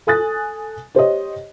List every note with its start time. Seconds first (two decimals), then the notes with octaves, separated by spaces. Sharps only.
0.07 A4 G#5 D#6 F#6 A6
0.95 G4 C5 C#5 D#5